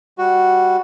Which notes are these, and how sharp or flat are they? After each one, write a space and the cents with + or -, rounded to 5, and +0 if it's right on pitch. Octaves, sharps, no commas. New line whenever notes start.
G3 +0 F#4 +0